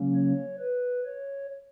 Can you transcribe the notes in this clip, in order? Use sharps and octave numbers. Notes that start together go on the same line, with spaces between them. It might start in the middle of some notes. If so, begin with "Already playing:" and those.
Already playing: C#3 F#3 A#3 C#4
C#5
B4
C#5